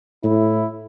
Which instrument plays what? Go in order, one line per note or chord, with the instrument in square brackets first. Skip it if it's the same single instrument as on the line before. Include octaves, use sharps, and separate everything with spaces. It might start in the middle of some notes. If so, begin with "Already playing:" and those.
[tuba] A2 [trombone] E4